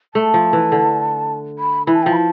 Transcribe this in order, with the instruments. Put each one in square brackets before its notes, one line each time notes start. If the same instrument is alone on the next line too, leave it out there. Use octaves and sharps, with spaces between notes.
[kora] A3 [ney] A5
[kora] F3
E3
D3
[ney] B5
[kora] E3 [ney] B5
[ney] A5
[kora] F3 [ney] G5
[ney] B5
A5